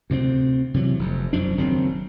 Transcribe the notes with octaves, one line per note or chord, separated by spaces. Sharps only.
D2 C3 G3 C4
C3 E3 F#3
F1 F2
E1 F#2 F3 D4
F#1 D#3 F#3 C4